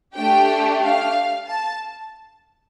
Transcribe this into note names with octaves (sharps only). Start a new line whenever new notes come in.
A3 D4 G4 G5
F5
A5